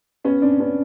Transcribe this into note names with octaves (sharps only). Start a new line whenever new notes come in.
B3 C#4
C4 D4
B3 C#4